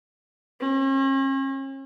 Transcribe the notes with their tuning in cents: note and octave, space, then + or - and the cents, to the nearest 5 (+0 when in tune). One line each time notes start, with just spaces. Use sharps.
C#4 -45